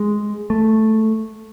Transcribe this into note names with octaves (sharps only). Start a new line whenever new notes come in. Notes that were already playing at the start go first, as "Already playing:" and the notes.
Already playing: G#3
A3